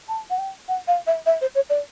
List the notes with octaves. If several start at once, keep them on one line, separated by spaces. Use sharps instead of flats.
A5
F#5
G5
F#5
F5
E5
E5
C5
C#5
D5